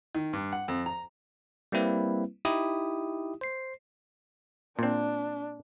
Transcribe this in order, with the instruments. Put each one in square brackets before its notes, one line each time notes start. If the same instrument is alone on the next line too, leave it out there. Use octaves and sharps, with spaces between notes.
[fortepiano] D#3
G2
F#5
F2
A#5
[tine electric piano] G3 A#3 C4 E4 B4
D#4 E4 G4 D#6
C5 C7
[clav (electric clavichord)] A#2 C4 [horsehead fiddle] D4